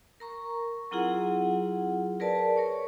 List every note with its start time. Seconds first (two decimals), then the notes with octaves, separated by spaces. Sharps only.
0.20 A#4 A#5 C#6
0.91 F#3 C4 E4 F4 G#4 F#5
2.20 G#4 A#4 B4 D5 A5
2.56 A#4 C#5 C#6